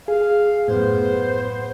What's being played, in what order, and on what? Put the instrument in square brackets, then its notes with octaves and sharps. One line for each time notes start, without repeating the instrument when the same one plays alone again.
[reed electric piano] G#4 [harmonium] F5
[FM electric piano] F#2 A2 [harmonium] B3 [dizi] C5